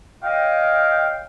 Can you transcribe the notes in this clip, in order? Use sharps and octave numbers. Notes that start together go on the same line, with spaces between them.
C#5 D#5 F5 G5